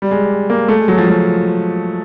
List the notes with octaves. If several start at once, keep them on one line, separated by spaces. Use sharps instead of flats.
G3
G#3
A#3
A3
G#3
F#3
F3
F#3